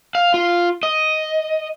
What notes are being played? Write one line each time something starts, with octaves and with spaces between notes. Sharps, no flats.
F5
F4
D#5